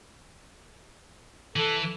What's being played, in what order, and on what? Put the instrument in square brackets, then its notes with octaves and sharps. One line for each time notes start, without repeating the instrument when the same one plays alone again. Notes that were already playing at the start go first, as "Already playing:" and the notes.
[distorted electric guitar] E3 [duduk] A4